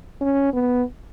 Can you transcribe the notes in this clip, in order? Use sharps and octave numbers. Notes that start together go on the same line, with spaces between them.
C#4
B3